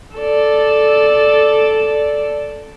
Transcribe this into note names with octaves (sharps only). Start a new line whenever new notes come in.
A4 D5